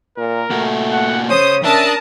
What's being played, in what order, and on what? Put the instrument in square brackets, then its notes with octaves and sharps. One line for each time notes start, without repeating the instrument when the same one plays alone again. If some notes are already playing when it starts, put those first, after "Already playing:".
[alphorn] A#2 [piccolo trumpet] A#4
[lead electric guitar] A#2 F#4 [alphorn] A3
[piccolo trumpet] F#5
[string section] C#3 D#6 [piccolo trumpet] C5 [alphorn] C#5
[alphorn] C#4 [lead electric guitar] D4 [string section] A#4 A5 D#6 [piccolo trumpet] E5